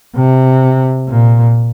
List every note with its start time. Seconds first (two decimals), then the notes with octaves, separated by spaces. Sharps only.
0.16 C3
1.09 A#2